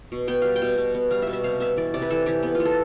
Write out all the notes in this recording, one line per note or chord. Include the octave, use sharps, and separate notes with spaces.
B2
B3 G5
G3 F5
G5
B2
B2
B3
G3 F5
B2 E5
E5
C3 F5
B3 E5
E3 D5
C3 D5
B4
E3 A4
E3 G4
B3
F4
B3
A4